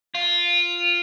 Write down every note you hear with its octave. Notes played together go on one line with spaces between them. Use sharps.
F4